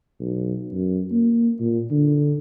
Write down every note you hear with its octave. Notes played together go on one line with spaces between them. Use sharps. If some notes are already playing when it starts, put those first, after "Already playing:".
B1
F#2
A#3
A#2
D3